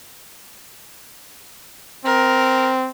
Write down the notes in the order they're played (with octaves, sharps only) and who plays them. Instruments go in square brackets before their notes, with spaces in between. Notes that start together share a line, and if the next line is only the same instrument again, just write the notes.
[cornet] C4 [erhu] A#4